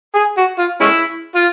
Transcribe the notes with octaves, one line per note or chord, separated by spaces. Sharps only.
G#4
F#4
F4
G#3 C#4 E4
F4